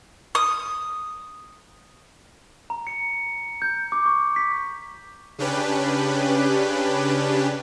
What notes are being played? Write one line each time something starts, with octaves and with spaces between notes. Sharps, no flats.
D#6
A#5
C#7
G6
D6
C#6
B6
C#3 C#4 D4 G4 B4